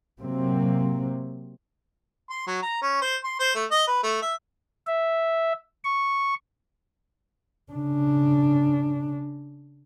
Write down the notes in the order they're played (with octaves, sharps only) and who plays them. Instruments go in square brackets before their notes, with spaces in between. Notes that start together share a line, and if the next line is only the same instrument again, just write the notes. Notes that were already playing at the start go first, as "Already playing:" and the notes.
[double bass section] C3 F#3 A#3 C4
[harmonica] C6
F#3
A#5
C#4
C5
C6
C5
A3
D#5
B4
A3
E5
[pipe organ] E5
C#6
[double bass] C#3 D4